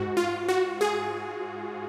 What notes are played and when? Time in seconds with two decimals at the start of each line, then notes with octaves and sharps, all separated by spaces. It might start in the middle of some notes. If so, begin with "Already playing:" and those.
Already playing: G#2 F#4
0.17 F4
0.49 F#4
0.81 G#4